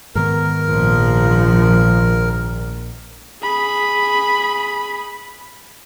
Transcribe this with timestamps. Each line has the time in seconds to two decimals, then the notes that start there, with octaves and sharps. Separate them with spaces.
0.15 G#2 D#3 B3 A#4
0.68 A#1 F3
3.43 G#4 B5